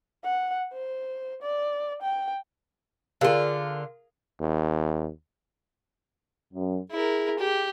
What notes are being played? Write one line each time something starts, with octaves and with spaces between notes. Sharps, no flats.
F#5
C5
D5
G5
D3 F4 G#4 A#4 F5
D#2
F#2
E4 G#4 A#4
G4